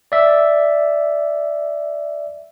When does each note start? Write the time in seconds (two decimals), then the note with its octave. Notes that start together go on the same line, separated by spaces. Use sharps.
0.12 D5 E5